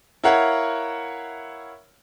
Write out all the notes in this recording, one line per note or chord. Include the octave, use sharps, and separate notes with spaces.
E4 A#4 C#5 F5 F#5